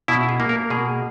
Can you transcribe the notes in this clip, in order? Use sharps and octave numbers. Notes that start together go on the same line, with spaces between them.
B2 E4
G#4
A#3
A#4
B2 G#4